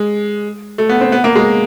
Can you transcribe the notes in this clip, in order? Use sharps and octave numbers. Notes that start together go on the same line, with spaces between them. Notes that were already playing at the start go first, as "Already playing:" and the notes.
Already playing: G#3
A3
B3
C4
B3
A#3
G#3